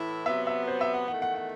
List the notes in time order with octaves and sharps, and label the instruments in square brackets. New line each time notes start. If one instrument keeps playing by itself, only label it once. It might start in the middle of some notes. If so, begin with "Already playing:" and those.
Already playing: [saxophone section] A2 E3 E4
[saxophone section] C3 F#3 B3 [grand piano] E5
[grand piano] E5
C5
E5
F#5
[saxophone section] E2 D#3 A3 [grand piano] F#5
[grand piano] F#5
F#5